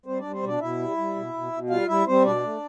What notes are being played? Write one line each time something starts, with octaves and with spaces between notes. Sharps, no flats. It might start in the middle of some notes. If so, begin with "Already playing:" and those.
G3 C4 C5
G3 D4 D5
C4 C5
B2 D4 D5
B2 E4 E5
G3
G3
B2
B2
B2
G3 F4 F5
G3 E4 E5
G3 C4 C5
B2 D4 D5
A3